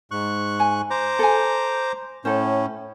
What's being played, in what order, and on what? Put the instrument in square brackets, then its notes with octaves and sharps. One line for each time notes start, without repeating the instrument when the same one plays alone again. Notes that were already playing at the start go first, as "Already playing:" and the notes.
[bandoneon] G#2 C#6 F#6
[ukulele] G#5
[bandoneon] C5 A#5 D6
[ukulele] A4 G#5
[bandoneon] A2 C#4 [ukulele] A4 C5